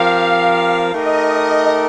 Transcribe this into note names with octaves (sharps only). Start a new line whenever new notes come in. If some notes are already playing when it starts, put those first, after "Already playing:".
Already playing: F3 C4 G4 A#4 F5
A3 D#4 G4 A#4 D#5